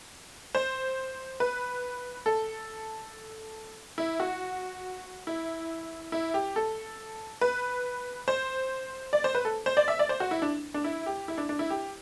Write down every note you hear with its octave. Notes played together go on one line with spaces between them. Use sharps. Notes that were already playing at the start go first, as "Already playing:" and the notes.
C5
B4
A4
E4
F#4
E4
E4
G4
A4
B4
C5
D5
C5
B4
A4
C5
D5
E5
D5
C5
F#4
E4
D4
D4
E4
G4
E4
D4
D4
E4
G4